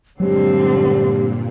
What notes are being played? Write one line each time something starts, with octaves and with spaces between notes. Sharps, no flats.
G2 A#2 D3 F#3 G#3 C4 G4